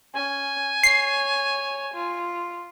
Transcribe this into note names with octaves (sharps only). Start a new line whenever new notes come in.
C#4 G#5
C#5 C7
F4